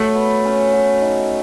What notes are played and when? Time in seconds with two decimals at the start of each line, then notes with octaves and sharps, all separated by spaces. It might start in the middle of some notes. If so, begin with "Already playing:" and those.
Already playing: F#3 A3
0.15 B3
0.45 C#4
0.74 F#4
1.02 D#4